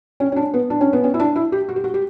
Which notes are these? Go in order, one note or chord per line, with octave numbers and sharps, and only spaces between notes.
C#4
C#4
D4
B3
D4
C#4
B3
C#4
E4
D4
E4
G4
F#4
G4
F#4
G4